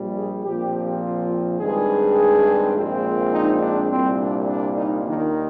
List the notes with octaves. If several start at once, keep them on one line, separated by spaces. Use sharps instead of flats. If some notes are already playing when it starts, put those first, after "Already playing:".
Already playing: A#1 A#2 G3
G#4
A#1 A#2 F3 C4 G4
F4
G2 D#3 G#3 C4 G#4
A#1 A#2 G#3 C4
D#4
D4
C2 A#2 G3 C4
D4
D4
D#4
D#2 D#3 A#3 D4